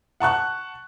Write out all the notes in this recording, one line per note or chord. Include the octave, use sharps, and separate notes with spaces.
F#5 A5 C#6 F#6